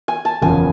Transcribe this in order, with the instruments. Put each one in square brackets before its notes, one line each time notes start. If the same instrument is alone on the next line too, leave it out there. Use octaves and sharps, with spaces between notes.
[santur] G#5
A5
[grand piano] F#1 E2 C#3 F3 [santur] G#5